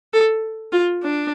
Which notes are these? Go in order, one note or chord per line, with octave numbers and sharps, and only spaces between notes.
A4
F4
D4